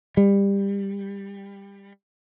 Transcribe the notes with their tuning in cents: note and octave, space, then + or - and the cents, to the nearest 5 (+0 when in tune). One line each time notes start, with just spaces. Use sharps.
G3 +20